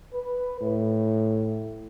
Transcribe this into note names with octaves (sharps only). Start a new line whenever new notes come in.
B4
A2